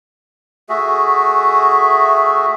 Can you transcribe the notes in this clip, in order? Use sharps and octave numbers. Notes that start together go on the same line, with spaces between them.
A3 F#4 G#4 E5